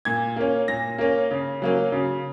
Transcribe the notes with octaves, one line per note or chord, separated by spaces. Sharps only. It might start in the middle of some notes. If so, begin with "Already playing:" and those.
A#2 G#6
A#3 C#4
A#2 A#6
A#3 C#4
C#3
F#3 A#3 C#4
C#3